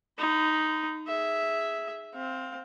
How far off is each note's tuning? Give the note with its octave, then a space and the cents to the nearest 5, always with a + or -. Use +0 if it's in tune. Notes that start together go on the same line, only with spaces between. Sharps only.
D#4 +0 B5 +45
G#4 +0 E5 +0
C4 +0 F5 +20